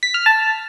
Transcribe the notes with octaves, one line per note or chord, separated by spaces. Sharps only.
B6
F6
A5